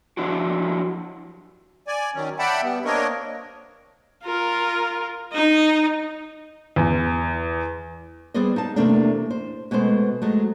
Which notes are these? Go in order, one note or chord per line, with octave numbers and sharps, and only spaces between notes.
F3 F#3 D4 E4 F#4 G4
D5 G#5
D#3 F#3 C#4
D5 E5 F#5 G5 A5 B5
G3 B3
A#3 C4 D4 A#4 C#5 D#5
F4 A#4
D#4 D#5
E2
G3 B3 G#4 C5 D5 D#5
D#4 F5 A5
E2 C3 A3 A#3 C4 D4
C5
B2 G#3 A3 B4 C5
F#3 G#3 A3